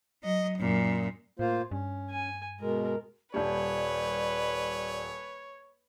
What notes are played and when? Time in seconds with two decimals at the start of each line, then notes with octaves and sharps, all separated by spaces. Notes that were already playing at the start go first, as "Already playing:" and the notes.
0.23 F#3 D#5
0.59 F#2 A#2
1.39 A2 A#3 F4 C5
1.71 G2 C#4
2.11 G#5
2.61 B2 G#3 A#4
3.34 D#1 G3 B4 C#5 D5